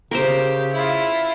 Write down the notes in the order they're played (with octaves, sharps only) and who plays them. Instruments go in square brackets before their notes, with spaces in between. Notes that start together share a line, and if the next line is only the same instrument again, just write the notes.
[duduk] C#3 [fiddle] G4 [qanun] A#4 C5
[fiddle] E4 F4